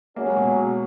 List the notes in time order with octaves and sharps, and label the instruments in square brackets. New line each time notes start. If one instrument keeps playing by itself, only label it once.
[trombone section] C#3 F#3 C#4 G#4 [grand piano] A#3
[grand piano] G#3
B2